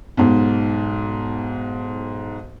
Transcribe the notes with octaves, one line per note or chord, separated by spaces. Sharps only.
B1 G#2